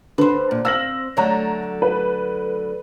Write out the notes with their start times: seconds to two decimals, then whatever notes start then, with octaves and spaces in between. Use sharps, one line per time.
0.18 D3 B4 C5
0.51 A#2
0.65 C4 F5 E6 A#6 F#7
1.17 D3 F#3 A3 C#5 A#5
1.82 B4